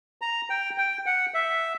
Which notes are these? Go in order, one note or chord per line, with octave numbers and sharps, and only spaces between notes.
A#5
G5
G5
F#5
E5